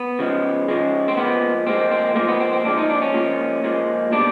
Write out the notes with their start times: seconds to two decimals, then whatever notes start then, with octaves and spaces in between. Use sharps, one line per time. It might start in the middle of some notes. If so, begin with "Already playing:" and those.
Already playing: B3
0.19 C#3 F3 G#3
0.68 C#3 F3 G#3
1.08 C4
1.17 A#2 F3 G#3 B3
1.66 A#2 F3 G#3 C4
1.91 C4
2.15 A#2 F3 G#3 A#3
2.28 B3
2.40 C4
2.53 C4
2.64 A#2 F3 G#3 D4
2.78 D#4
2.90 D4
3.02 C#4
3.14 A#2 F3 G#3
3.64 A#2 F3 G#3
4.12 B2 G3 D4